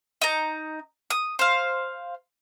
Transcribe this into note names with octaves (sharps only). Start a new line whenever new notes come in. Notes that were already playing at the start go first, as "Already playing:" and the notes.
D#4 A#5
D#6
C5 F5